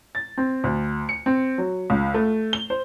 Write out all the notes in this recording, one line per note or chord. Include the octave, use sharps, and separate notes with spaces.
A6
C4
D2
C#7
C4
F#3
C#2
A3
G7
C5